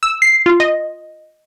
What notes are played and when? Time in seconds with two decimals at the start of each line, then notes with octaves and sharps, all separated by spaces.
0.03 E6
0.22 C7
0.46 F4
0.60 D#5